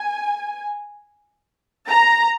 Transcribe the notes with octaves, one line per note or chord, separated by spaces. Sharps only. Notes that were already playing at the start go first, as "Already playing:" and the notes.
Already playing: G#5
A#5